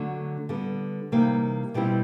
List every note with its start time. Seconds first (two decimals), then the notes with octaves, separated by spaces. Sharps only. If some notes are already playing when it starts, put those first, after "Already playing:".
Already playing: D3 F#3 A3
0.49 D3 G3 B3
1.12 C3 E3 G3 A#3 D#4
1.74 B2 G3 C4 E4 G4